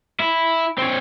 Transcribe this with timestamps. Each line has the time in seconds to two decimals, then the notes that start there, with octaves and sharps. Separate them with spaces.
0.20 E4
0.78 C4 C#5